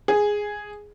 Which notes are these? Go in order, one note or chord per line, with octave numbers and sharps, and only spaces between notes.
G#4